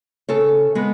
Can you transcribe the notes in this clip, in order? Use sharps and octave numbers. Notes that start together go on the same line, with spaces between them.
C#3 A4 C#5
G#3 B3